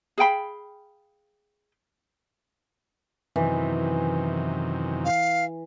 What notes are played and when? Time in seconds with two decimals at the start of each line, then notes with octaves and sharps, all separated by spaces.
0.18 G#4 F5 G5 B5
3.36 F#2 C3 D#3 E3
5.05 F5